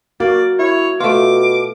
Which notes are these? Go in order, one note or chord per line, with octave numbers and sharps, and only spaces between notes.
A#3 F#4 D5
E4 C#5
B2 A3 F4 D6